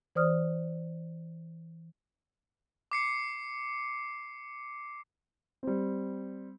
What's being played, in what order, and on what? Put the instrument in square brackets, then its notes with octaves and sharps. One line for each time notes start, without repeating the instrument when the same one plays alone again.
[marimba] E3 C5 D5 D#6 F6
[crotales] D6 C7 C#7
[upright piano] G3 C4